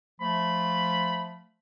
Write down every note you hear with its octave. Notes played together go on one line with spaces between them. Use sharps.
F3 A3 B5